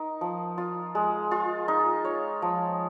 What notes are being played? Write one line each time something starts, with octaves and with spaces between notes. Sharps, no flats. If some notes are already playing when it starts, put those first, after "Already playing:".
Already playing: D#4 A#4
F3
F4
G#3
F4
D#4
C#5
F3